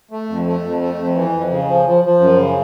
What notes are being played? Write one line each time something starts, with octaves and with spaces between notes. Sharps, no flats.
A3
F2
A3
F2
A3
F2
E3
F2
C#3
F3
F3
F3
F#2
C#3